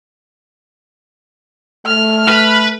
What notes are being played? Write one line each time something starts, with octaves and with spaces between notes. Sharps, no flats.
A3 F6
B4